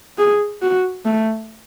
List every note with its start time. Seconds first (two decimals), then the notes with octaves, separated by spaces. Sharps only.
0.18 G#4
0.62 F#4
1.05 A3